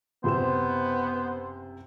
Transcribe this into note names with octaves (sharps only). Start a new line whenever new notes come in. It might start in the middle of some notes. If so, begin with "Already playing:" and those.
F#1 C3 B3 C5 E7